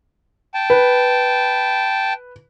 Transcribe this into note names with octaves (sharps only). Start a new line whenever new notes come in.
G5 A5
B4